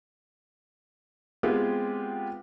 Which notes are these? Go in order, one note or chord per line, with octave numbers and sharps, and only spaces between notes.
G#3 B3 C4 F4 G4 G#4